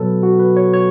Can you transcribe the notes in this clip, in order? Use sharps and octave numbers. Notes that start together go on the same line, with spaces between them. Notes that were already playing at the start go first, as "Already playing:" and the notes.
Already playing: B2 F#3 A4 B4
F#4
B4
C#5
C#5